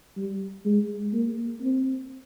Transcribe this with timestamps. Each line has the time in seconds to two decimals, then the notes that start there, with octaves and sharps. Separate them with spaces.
0.17 G3
0.65 G#3
1.13 A#3
1.62 C4